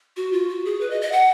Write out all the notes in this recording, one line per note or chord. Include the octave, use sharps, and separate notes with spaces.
F#4
F4
F#4
G#4
B4
D#5
D#5
F#5